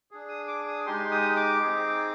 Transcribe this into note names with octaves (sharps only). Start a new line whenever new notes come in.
D4 G#4
D#6
D6
D#6
G#3 D#4 G4 C6
D#6
D6
C4 D#4 G#4